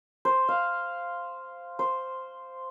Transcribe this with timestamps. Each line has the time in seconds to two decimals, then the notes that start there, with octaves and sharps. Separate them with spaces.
0.25 C5
0.49 F5
1.79 C5